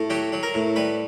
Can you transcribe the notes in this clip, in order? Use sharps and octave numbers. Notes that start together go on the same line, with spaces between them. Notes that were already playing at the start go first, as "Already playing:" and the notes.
Already playing: A2
F#3 G4
F#3
A#4
A2
G3 B4